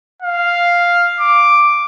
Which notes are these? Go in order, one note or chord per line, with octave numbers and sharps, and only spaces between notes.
F5
D6